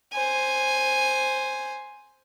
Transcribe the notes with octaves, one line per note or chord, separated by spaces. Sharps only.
C5 G#5